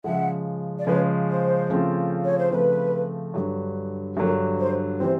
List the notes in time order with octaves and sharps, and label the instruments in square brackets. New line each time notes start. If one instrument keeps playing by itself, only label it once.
[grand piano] C#3 F3 G#3 [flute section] E5 F#5
[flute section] D5
[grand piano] C#3 F3 G#3 [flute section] B4 C#5
[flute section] C5
[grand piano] C#3 F3 A3 C4 F4
[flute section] C#5
C5
[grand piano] C#3 F3 A3 C4 F4 [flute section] B4
[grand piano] G2 D3 F#3
[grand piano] G2 D3 F#3 [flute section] A#4
[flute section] C5
[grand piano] C3 E3 G3 C4 [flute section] C5